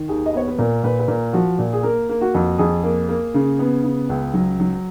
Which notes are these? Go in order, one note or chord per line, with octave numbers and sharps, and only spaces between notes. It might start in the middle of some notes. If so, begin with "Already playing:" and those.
Already playing: D#3
D#2 G#4
D#5
B3 C#5
B4
A#2 A#4
A#2 B4
B4
A#2 A#4
F3 F#4
A#2
G#4
A#3 A#4
A#3
F#4
F2
F2 G#4
A#3
A#3
C#3
B3
C#3
C#2
F#3
F#3